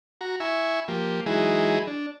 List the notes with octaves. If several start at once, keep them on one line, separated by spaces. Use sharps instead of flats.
F#4 A#5
E4 E5 G#5 C#6
F3 A#3 G4
E3 F#3 G#3 D#4 E4 G#4
D4